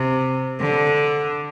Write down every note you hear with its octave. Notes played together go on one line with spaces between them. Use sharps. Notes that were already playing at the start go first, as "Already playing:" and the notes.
Already playing: C3
D3